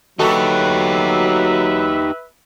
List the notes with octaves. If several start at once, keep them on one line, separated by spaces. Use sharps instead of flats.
F#3 D#4 F#4 G4 A4 B4 E5